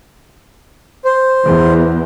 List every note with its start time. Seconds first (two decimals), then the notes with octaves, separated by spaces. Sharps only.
1.05 C5
1.44 E2